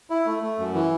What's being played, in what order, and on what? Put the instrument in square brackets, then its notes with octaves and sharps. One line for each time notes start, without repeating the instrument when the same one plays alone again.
[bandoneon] E4
A3
A3
F#2
E3